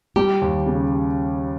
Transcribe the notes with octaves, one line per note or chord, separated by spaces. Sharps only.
G3 G4
D#2
C#3